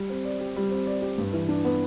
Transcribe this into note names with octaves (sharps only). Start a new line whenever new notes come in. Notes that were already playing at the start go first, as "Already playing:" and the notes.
Already playing: G3
C4
D5
G4
G3
C4
D5
G4
G2
E3
D4
B3